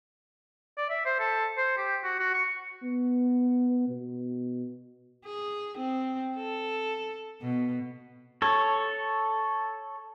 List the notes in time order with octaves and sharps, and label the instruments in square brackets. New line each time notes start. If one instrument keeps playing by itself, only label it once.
[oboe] D5
E5
C5
A4
C5
G4
F#4
F#4
C#6
[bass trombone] B3
B2
[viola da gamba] G#4
C4
A4
B2
[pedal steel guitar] A4 C#5